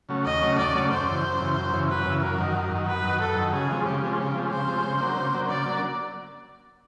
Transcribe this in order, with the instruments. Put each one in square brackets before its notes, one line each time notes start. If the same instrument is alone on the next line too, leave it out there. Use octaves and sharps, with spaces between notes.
[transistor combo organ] C#3 F#3 A3 C#4
[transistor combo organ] D#2 [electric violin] D#5
[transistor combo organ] C#3 F#3 A3 C#4
[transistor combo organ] D#2 [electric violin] D5
[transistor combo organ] C#3 F#3 A3 C#4
[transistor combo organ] F#2 [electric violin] C5
[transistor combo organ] C#3 E3
F#2
C#3 E3
F#2
C#3 E3
[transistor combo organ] F#2 [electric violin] B4
[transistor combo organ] C#3 E3
[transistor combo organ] F#2 [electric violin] A#4
[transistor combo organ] D#3 F#3
F#2
D#3 F#3
[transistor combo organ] F#2 [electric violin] B4
[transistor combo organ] D#3 F#3
[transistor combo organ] F#2 [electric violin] A4
[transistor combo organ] D#3 F#3
[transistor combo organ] C#3 [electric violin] G#4
[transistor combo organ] F3 G#3 C4
[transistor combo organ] C#3 [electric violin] G4
[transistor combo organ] F3 G#3 C4
[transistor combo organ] C#3 [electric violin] G4
[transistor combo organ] F3 G#3 C4
[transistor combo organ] C#3 [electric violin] C5
[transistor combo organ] F3 G#3 C4
C#3
F#3 A#3 D4
C#3
F#3 A#3 D4
[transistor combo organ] C#3 [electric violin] D5
[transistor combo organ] F#3 A#3 D4